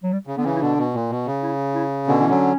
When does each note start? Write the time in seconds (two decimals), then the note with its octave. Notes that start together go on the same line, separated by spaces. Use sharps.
0.03 F#3
0.13 G3
0.27 C#3
0.36 D3 B3
0.45 C#3 E3 C#4
0.56 E4
0.61 B2 D3 D4
0.78 B2
0.94 A#2
1.10 B2
1.26 C#3
1.43 E4
1.75 E4
2.07 B2 D3 C#4
2.21 E3
2.29 D3 F#3